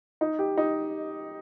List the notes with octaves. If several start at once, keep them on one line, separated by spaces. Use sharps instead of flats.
D#4
G4
D#4